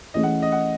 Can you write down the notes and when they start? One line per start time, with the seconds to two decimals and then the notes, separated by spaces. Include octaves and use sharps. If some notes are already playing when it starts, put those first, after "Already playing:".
0.14 E3 A3 C#4 E4 G#4 D#5
0.23 F#5
0.42 D#5
0.52 F#5